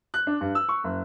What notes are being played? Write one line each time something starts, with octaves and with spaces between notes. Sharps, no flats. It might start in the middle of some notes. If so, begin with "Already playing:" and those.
F#6
D4
G2
E6
C#6
F#1